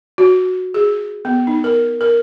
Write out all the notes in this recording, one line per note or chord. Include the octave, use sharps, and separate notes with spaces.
F#4
G#4
B3
D#4
A#4
A#4